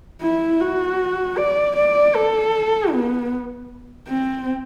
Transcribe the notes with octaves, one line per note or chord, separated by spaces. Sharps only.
E4
F#4
D5
D5
A4
B3
C4